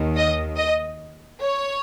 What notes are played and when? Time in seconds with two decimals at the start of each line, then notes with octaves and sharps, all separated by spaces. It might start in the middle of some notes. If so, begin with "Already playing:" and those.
Already playing: D#2 D#3
0.16 D#5
0.57 D#5
1.42 C#5